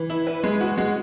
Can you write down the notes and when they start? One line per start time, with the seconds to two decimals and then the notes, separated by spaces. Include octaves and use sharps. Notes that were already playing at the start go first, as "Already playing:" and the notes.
Already playing: E3
0.10 E4
0.27 B4
0.44 G#3
0.60 F#4
0.78 G#3